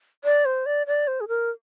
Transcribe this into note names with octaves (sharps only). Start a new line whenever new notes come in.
D5
C5
D5
D5
C5
G#4
A#4